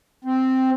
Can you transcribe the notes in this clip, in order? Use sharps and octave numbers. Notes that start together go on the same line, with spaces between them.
C4